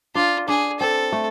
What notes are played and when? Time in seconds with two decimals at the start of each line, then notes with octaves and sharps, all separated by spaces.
0.15 D4 F4
0.48 D4 G#4
0.80 C4 A4
1.12 A3